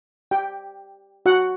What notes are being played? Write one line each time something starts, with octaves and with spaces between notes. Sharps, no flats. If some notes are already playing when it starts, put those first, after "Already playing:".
G4 G5
F#4 F#5